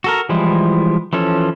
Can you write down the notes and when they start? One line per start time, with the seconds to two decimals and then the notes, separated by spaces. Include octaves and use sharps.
0.04 F#4 A4 A#4
0.29 E3 F3 G3 G#3 E4
1.13 E3 F3 C#4 A4